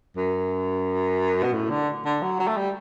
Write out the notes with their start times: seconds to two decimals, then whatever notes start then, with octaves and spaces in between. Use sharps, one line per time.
0.17 F#2
1.43 B2
1.53 A2
1.70 D3
2.05 D3
2.22 F#3
2.39 F#3
2.48 A3
2.57 G3